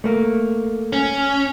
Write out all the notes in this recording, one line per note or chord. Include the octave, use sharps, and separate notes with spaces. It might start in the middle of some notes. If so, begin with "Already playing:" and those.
A3 A#3
C#4